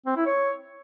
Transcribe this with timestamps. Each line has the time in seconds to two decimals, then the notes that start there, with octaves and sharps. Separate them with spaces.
0.06 C4
0.16 E4
0.26 C#5